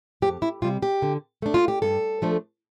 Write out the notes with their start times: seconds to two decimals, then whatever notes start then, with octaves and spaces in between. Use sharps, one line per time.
0.22 F2 G4
0.42 E4
0.62 C3 G3 F4
0.82 G4
1.02 D3
1.42 A3 D4
1.54 F4
1.68 G4
1.82 G2 A4
2.22 F3 A3 D4